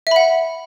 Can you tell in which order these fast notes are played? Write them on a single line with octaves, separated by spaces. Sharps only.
E5 B5 F#5